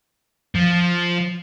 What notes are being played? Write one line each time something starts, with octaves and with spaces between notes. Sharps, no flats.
F3